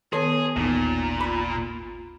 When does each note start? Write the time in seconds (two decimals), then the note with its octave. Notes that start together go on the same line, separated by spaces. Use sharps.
0.13 D#3 B3 G#4 A4 C#5
0.56 G#1 D#2 A#2 E3 B3 D#4
1.21 F4 A#5 B5